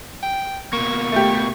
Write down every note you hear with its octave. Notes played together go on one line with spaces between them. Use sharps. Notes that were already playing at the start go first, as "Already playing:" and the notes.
G5
B2 A#3 C#6
A3 G4